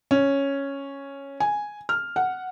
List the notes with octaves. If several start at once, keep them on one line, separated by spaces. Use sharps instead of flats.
C#4
G#5
F6
F#5